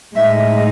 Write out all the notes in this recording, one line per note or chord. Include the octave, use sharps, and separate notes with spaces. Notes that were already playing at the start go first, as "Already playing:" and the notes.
A2 G#3 D#4 E5